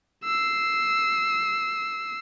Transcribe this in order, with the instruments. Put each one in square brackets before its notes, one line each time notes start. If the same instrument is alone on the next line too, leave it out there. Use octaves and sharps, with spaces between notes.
[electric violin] E6 C7